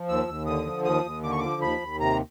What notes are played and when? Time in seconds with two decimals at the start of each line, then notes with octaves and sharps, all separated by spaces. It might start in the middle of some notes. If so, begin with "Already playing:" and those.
Already playing: F3
0.08 D#2 E6
0.28 D#2
0.46 D3 D#6
0.66 F3
0.84 D#2 D#6
1.04 D#2
1.23 D3 D6
1.32 C#6
1.39 F3 D6
1.61 D#2 B5
1.81 D#2
1.99 C3 A#5